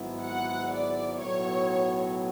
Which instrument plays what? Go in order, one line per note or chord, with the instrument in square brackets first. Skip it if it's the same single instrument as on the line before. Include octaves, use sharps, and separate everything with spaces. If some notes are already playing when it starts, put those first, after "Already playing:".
Already playing: [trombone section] G#1 G#2 F#3 B3 E4
[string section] F#5
D5
[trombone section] B1 A2 F#3 B3 [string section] C#5